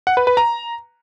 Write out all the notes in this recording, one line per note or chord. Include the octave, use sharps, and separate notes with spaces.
F#5
B4
B4
A#5